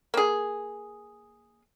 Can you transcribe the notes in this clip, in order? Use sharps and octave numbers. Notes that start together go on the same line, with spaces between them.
A#3 G#4